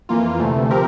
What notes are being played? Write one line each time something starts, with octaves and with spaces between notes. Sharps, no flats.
F2 E3 A#3 F4
D2 C3 E3 A3
F3 C4 G4 A#4